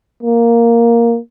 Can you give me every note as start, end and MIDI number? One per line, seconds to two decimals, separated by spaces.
0.23 1.18 58